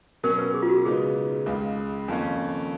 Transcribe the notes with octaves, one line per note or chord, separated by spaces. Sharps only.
B2 F#3 C#4 A#4
B4
G#4
F4
F#4
C#3 G#3 B3 D#4 G#4
C#2 C#3 G#3
F2 D#3 A#3 C#4